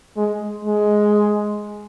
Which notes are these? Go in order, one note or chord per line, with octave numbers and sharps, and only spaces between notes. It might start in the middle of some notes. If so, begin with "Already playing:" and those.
G#3
G#3